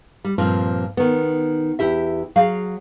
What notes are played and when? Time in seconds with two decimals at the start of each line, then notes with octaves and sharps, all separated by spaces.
0.25 G3
0.38 G2 A#2 F3 C4
0.97 D#3 B3
1.79 E2 E4 G4 E5
2.36 F#3 G#4 F5